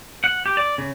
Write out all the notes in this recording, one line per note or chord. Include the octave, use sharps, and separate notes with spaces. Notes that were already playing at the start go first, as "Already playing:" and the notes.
F#5
G4
D5
C#3